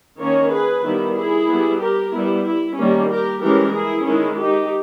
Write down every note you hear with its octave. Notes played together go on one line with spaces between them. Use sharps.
D#3 A#3 C#4 A#4 C#5
G#4 B4
D#3 G3 B3 E4
E4 G#4
G3 B3
G4 A#4
G3 B3 E4
E4
D#3 G3 A#3 C#4
G4 A#4
E3 G#3 C#4 G4 A#4
E4 G#4
D#3 G#3 C#4 E4
D#4 G4